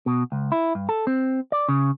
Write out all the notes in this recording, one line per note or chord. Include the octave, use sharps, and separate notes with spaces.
B2
C#2
E4
G2
A4
C4
D5
C#3